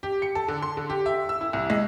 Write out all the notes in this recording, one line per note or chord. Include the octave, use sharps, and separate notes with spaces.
G4
C#7
A4
D3
C6
D3
G4
E5
E6
E4
C2
G#3